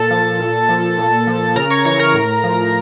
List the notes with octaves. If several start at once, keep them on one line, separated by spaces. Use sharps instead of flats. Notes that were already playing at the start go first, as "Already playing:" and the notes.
Already playing: A#2 A4 A5
F3
A#2
F3
A#2
F3
C#3 A#4 A#5
C#5 C#6
E3 C#5 C#6
A#4 A#5
A2
F3